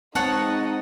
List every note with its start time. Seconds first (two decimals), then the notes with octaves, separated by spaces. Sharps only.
0.15 G#3 C4 D#4 C#5 D#5 F#5 A5